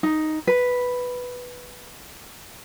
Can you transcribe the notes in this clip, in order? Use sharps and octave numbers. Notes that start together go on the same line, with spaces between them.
D#4
B4